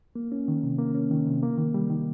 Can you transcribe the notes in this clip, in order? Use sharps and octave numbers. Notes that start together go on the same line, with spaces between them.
A#3
C#4
D#3
C3
A#3
C#4
D#3
C3
A#3
D#3
G3
D#3